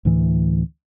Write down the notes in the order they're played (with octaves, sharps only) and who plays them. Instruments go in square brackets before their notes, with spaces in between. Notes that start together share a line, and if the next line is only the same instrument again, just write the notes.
[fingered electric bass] D2 A2 E3